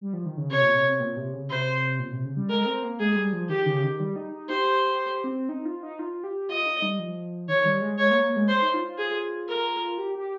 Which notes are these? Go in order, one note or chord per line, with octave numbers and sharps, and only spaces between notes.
G3
F3
D#3
C#3
C3 C#5
A#2
C3
C3
A#2
C3
C#3
C3 C5
A#2
C3
C#3
G3
G#3 A#4
C4
A#3
G#3 G#4
G3
F3
D#3 G4
C#3
D#3
G3
D#4
D#4
G4 C5
G4
C4
D#4
F4
D#4
F4
G4
F4 D#5
D#4
G3
F3
D#3 C#5
G3
G#3
G#3 C#5
A#3
A#3
G#3
C5
D#4
F4
F4
G#4
A#4
G4
G4